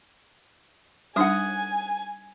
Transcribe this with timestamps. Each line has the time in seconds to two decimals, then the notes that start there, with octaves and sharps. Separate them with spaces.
1.16 G3 D4 D#4 F#5 G#5 D#6